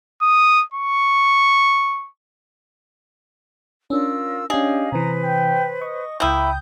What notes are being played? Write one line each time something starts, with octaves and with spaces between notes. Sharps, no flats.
D#6
C#6
C#4 D4 F4 A#4 E6
C#4 D4 G4 G#4 D#5 F5
C3 E3 B4 C5 A#5
G5
D#5 C#6
C#2 A#3 E4 G5 D#6 G6